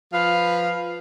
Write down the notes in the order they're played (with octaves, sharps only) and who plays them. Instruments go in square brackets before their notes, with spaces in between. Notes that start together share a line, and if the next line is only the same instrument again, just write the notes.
[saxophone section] F3 B4 F5